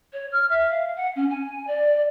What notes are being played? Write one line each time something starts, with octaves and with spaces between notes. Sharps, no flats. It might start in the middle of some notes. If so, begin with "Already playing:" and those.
C#5
F6
E5
F5
F#5
C#4
G#5
D5